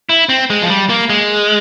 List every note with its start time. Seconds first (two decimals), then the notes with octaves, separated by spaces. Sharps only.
0.09 E4
0.29 C4
0.50 G#3
0.62 F3
0.70 G3
0.90 A#3
1.10 G#3